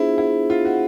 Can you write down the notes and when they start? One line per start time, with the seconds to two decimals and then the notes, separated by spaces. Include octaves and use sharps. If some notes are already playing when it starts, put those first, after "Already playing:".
Already playing: B3 D4 E4 F4 G#4 C5
0.18 E4
0.50 F4
0.65 F#4